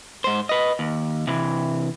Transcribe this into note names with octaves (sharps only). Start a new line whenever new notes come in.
G#2 C5
B4 D#5
D#2
C3 E3